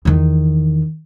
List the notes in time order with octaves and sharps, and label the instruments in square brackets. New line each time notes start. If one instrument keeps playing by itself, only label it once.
[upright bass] E2 D#3